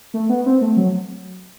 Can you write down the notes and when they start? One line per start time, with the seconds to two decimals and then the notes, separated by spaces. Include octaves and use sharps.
0.14 A3
0.29 B3
0.46 C4
0.62 A3
0.77 F#3